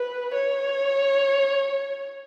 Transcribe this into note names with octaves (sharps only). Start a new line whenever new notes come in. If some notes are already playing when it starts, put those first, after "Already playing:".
Already playing: B4
C#5